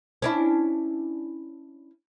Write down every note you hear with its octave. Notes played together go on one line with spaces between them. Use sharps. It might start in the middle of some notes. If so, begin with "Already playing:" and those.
C#4 D4 E4